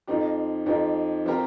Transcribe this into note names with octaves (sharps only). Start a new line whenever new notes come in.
F2 F3 C4 D#4 G4
F2 F3 C4 D#4 G4
F3 C4 G4 A#4